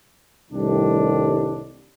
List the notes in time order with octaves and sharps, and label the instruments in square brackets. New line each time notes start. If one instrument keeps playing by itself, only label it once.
[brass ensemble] C2 A2 D#3 G3 D4